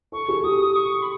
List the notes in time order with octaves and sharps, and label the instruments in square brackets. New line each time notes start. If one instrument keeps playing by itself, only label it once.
[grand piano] A4 [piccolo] C#6
[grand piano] G#4
[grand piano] G4 [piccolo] D#6
[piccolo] C#6
B5